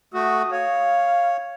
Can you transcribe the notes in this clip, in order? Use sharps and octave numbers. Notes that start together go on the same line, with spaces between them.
A3 F#4 D#6
C#5 F5